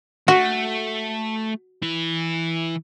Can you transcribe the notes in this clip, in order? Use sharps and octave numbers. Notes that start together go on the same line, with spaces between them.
A3 F#4
E3 E4